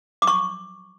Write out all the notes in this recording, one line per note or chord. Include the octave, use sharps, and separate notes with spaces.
D6
C#6